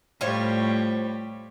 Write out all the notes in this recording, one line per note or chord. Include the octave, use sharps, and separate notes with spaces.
A2 G3 F4 C5 C#5